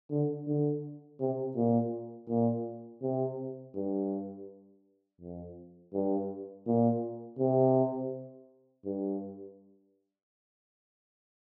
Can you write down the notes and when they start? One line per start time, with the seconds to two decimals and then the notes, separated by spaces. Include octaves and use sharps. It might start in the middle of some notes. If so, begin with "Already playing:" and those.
0.11 D3
0.47 D3
1.20 C3
1.56 A#2
2.29 A#2
3.03 C3
3.75 G2
5.21 F2
5.94 G2
6.67 A#2
7.39 C3
8.85 G2